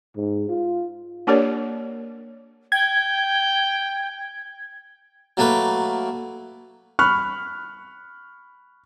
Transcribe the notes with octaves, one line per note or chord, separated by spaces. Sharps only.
G#2
F4
A#3 D4 G4 A#4 C#5 D5
G5 G#6
F#3 A3 A#3 A#4 B4
B5 C#6 F6 F#6